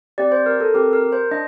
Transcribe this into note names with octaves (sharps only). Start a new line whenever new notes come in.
C4 G4 D5
C5
A#4
A4
C4 G4 A#4
A#4
C5
D4 D#5